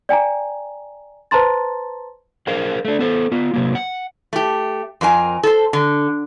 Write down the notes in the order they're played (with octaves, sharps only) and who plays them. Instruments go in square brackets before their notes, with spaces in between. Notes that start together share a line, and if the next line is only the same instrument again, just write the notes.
[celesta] D5 G5 G#5 A#5
B4 C5 A5 A#5 C6 A6
[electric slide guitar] G#4 A#4 C5 F5
A3 D4
B3 A4 C5
B3 F4
C3 F#3 A#3
F#5
[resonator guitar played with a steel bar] A3 G4
F2 C4 A#4 G#5
A4 C5
D3